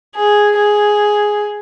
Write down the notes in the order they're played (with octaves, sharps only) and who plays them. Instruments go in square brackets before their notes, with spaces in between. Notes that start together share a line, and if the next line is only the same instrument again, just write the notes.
[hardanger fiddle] G#4
G#4